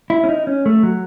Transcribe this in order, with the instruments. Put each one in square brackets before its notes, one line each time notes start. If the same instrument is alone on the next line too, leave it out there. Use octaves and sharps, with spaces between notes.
[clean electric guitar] E4
C#4
D#4
C#4
A3
F#3